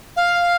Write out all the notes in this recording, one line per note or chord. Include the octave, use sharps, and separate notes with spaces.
F5